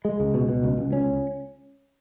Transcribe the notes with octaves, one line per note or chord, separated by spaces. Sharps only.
G#3
C#2
B2
B2
C#2
C#2
C#4